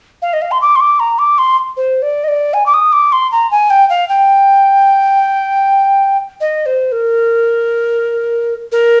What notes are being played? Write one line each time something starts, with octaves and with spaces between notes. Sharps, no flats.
F5
D#5
F5
C6
D6
C6
D6
A#5
D6
C6
C5
D5
D#5
D5
G#5
D6
D#6
D6
C6
A#5
G#5
G5
F5
G5
D#5
C5
A#4
A#4